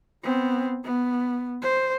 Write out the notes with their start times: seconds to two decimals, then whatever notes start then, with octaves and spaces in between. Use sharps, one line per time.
0.23 B3 C4
0.84 B3
1.62 C5